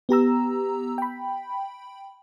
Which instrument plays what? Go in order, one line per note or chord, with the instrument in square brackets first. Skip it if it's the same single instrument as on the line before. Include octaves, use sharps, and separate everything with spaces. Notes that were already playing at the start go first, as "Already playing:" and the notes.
[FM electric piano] B3 G4 A#5 E6
G5 B5